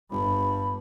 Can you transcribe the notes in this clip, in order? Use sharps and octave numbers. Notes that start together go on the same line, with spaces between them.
G1 G2 B5